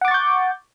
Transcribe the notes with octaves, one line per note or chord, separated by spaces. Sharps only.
F#5 C#6 D6 G6 A6